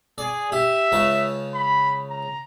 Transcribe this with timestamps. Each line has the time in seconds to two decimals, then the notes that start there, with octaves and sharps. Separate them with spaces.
0.18 G#4 D5
0.52 G4 E5
0.92 C#2 C#3 A5
1.54 B5
2.10 A#5